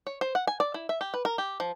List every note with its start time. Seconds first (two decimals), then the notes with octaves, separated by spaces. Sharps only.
0.07 C#5
0.21 C5
0.35 F#5
0.47 G#5
0.60 D5
0.74 E4
0.89 E5
1.01 G4
1.14 B4
1.25 A#4
1.38 G4
1.60 F3